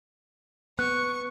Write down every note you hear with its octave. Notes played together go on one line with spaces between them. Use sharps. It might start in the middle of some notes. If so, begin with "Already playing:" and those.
B3 C#6 F#6